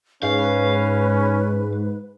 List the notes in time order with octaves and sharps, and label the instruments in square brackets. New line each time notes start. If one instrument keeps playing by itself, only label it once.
[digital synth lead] G#2 [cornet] C#4 [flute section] B4 [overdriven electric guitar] F5